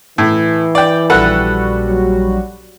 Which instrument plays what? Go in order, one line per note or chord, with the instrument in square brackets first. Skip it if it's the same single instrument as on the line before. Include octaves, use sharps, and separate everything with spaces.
[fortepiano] A2 [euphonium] E3
[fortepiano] D5 G5
[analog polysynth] A#1 G3 F#4 [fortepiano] A4 B4 F#5
[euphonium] F#3